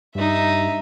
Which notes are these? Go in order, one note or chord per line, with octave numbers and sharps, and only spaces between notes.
G2 D#4 E5